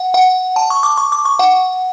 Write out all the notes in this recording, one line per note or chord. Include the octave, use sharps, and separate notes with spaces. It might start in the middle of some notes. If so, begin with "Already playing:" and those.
Already playing: F#5
F#5
A5
C#6
D6
C#6
D6
C#6
F#5